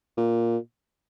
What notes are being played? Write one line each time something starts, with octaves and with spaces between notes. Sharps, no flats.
A#2